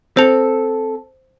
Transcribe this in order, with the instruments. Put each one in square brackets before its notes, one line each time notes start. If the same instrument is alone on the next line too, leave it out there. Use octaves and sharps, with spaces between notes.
[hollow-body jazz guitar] C4 A4 [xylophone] C5 F7